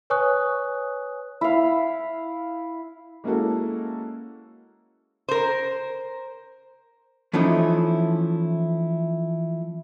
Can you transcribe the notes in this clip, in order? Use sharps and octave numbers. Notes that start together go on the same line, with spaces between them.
B4 C#5 G#5 C#6 D#6 F#6
E4 F5
G#3 A#3 C#4 E4 F#4 A4
A#4 C5
E3 F3 A3 C#4 D#4 E4